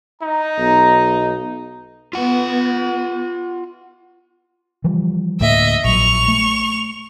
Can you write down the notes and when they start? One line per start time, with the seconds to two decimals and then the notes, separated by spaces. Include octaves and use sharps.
0.22 D#4 A#5
0.58 B1
2.13 B3 F4 F#5
4.84 E3 F3 G3
5.41 D2 A2 A#3 D#5 E5
5.85 A#1 F#3 C#6 F7
6.28 A3